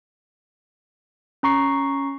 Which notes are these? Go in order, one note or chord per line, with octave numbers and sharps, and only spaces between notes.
C#4 A#5 C#6 C7